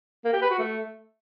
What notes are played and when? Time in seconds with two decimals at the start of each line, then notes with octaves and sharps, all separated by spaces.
0.25 A#3
0.33 G4
0.42 B4
0.50 F#4
0.59 A3